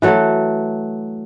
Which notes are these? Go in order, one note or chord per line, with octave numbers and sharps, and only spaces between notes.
E3 F#3 A3